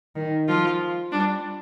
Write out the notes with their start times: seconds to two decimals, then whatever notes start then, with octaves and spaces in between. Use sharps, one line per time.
0.15 D#3
0.48 F3 F4
1.12 G3 D4